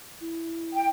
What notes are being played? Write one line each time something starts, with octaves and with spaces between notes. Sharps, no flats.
E4
G5